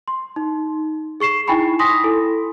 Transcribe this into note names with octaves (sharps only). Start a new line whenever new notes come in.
C6
D#4
G#4 C#6 C7 E7
D#4 E4 G5 G#5 B5 C#6
G#5 C6 D#6 A#6 B6
E4 A4